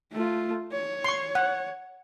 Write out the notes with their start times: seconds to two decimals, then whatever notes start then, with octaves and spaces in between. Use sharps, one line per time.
0.12 A3 F4
0.72 C#5
1.04 C6 C#6
1.35 F#5